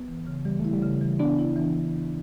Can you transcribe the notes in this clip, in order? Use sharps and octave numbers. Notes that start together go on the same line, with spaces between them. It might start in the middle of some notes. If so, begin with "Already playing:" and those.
Already playing: B3
E3
C#3
E3 G3
A3 E4
G3
C#3
E3
B3 D4
E4
E3